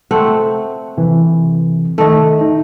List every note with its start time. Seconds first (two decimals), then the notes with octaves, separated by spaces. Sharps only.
0.11 A3 C4 F#5
0.97 C3 E3
1.98 D#3 A3 D#5
2.41 D#4